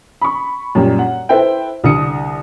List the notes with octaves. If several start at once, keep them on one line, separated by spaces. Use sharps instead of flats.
B5 C#6
F#2 A#2 G3 G4
F#5
E4 A4 B4 C5 G5
C2 D3 D#6 C#7